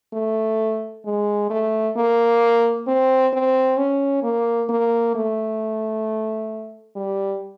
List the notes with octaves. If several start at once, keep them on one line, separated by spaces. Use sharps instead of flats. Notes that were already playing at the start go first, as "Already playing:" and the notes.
A3
G#3
A3
A#3
C4
C4
C#4
A#3
A#3
A3
G3